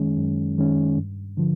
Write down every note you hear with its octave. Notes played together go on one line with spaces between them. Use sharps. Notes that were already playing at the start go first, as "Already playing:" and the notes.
Already playing: F#2 D#3 G#3 C#4
F#2
D#3 G#3 C#4
G2
D3 F3